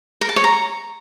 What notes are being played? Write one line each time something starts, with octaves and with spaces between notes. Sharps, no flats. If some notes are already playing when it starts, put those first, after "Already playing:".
A#4
A5
C#5
A#5